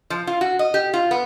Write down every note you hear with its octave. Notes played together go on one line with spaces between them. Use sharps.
F3
F4
F#4
D#5
G4
F4
B3